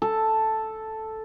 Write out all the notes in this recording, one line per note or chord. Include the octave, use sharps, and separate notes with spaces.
A4